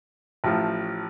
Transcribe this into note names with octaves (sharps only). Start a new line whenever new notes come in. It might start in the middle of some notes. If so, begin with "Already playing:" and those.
A1 A2 F3